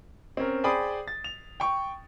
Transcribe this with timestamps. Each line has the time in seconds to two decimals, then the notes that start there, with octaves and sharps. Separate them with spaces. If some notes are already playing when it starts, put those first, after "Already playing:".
0.37 C4 C#4 A#4
0.64 G#4 C5 D5 G5 B5 D#6
1.08 A6
1.24 F7
1.60 G5 C#6